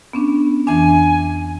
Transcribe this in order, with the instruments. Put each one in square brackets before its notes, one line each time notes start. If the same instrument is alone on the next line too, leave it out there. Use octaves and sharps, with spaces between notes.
[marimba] B3 C#4 D4
[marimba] F2 E3 D4 [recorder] G#5